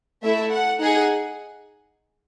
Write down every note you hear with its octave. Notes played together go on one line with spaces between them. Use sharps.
A3 E4 A4 E5
F#5
D#4 G#4 F#5